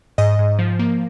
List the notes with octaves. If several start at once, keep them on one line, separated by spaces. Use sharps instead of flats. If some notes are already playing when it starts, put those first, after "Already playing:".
G#2 D#5
G#2
F3
A#3